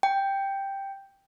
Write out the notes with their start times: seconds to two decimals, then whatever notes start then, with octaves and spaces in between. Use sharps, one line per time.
0.03 G5